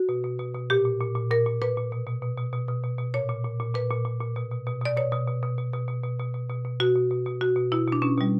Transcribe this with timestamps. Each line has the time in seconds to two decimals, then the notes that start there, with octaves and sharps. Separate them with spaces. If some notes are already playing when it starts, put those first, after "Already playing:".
Already playing: F#4
0.09 B2
0.24 B2
0.39 B2
0.55 B2
0.70 A#2 G4
0.85 A#2
1.01 A#2
1.15 A#2
1.31 A#2 A#4
1.46 A#2
1.62 A#2 B4
1.77 A#2
1.92 B2
2.07 B2
2.22 B2
2.38 B2
2.53 B2
2.68 B2
2.83 B2
2.99 B2
3.14 A#2 C#5
3.29 A#2
3.44 A#2
3.60 A#2
3.75 A#2 B4
3.91 A#2
4.05 A#2
4.21 A#2
4.36 B2
4.51 B2
4.67 B2
4.82 B2 D5
4.97 B2 C#5
5.12 B2
5.28 B2
5.43 B2
5.58 B2
5.73 B2
5.88 B2
6.04 B2
6.19 B2
6.34 B2
6.50 B2
6.65 B2
6.80 B2 F#4
6.95 B2
7.11 B2
7.26 B2
7.41 B2 F#4
7.56 B2
7.72 B2 E4
7.87 B2 D4
8.02 B2 C#4
8.17 B2 G3